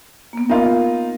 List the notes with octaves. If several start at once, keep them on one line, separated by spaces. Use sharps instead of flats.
A#3 B3
D#4 F4 A#4 D#5 B5